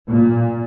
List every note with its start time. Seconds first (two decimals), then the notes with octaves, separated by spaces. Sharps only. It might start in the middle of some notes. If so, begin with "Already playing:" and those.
0.11 A#2